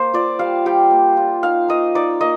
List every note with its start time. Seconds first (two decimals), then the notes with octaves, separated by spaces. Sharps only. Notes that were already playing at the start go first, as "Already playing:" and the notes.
Already playing: A#3 C5
0.14 F4 D5
0.39 G3 F5
0.66 G3 G5
0.91 A#3
1.17 F4
1.43 D#4 F5
1.68 A#3 D#5
1.95 D#4 D5
2.21 A#3 D#5